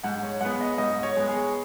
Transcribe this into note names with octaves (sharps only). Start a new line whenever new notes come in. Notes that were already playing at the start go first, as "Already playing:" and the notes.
G#2 F#5
C#5
G#3 B3 F#5
D#5
G#2 D#5
C#5
G#3 B3
G#4